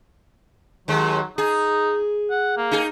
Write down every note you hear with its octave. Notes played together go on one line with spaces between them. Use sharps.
D#2 F#3 G#3
D#4 G#4
F#5
A#3
D#4 G#4